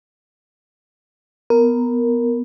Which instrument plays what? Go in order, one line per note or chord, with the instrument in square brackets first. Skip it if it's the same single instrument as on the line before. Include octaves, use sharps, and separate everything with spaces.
[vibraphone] B3 [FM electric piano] A#4